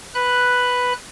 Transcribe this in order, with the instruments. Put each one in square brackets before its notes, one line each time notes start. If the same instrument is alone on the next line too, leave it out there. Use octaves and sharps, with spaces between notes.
[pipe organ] B4 F#6